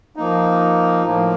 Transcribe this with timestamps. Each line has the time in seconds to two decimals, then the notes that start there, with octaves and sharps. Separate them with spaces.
0.16 F3 A#3 D#4
1.06 A2 F3 A#3